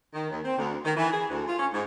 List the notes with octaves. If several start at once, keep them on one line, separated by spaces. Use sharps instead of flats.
D#3
D#2
C4
D2
D#3
E3
G#4
D2
F4
C#4
G#2